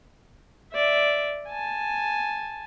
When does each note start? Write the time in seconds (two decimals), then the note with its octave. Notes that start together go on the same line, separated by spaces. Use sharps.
0.74 D5 E5
1.49 G#5 A5